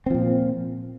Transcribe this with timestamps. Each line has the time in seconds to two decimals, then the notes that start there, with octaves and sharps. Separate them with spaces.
0.06 C4
0.10 F3
0.14 A#2